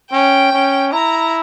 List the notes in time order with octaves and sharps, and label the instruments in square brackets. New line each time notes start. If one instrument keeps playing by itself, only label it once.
[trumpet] C#4 [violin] G5
[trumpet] C#4
[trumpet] E4 [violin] A#5